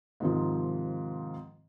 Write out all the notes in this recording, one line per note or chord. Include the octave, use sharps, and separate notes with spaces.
G#2 C3 D#3 F3